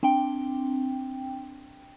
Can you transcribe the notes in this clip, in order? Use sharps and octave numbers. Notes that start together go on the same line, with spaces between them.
C4 D4 G5